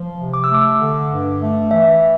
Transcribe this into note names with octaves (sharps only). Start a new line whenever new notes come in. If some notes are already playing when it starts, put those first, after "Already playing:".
Already playing: F3
C3
D6
E6
A3 D6
D3
G2
A3
E3 E5